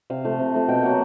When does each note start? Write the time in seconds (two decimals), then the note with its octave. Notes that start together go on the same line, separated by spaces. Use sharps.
0.10 C3 F5
0.25 F3 A3
0.39 C3
0.54 F3 A3
0.69 B2 G5
0.83 F#3 A#3 F#5